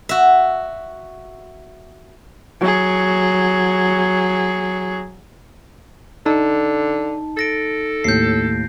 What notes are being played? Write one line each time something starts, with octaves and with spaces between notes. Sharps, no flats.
F#4 E5
F#3 G#4
D3 D#4 A5
A4 A6 A#6 D7
D#2 A2 G6 C7